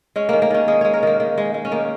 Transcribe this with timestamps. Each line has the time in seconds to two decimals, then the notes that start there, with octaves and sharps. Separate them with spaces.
0.16 G#3 C#4
0.29 D#3 A#3
0.42 A#3
0.50 D#3 C#4
0.68 G#3 D#5
0.81 G#3 C#5
0.94 A#4
1.03 D#3 A#3
1.20 D#3
1.38 G#3
1.54 G#3
1.65 C#4
1.72 D#3 A#3